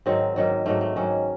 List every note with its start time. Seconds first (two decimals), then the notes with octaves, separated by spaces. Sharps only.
0.06 G#2 D#3 F#3 C4
0.36 G#2 D#3 F#3
0.66 G#2 D#3 F#3 A3
0.81 A3
0.96 G#2 D#3 F#3 C#4